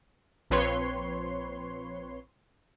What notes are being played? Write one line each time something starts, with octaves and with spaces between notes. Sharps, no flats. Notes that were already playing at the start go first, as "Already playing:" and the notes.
A#1 F3 C4 B4 C#5 C6